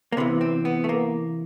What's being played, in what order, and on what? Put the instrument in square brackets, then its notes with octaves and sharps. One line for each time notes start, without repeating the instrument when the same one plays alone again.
[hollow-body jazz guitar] A#3
C3 E3 B3
C4
B3
A3
A#3